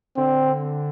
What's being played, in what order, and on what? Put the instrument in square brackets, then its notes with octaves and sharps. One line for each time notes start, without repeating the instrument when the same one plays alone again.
[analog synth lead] D3 [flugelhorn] C4